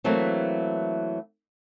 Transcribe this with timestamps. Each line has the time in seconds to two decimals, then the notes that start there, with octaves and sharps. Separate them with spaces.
0.04 E3 F#3 A3 A#3 C4 E4